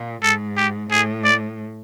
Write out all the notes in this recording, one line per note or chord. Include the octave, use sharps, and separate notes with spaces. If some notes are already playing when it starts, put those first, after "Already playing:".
Already playing: A#2
G#2 A4
G4
A2 G#4
D5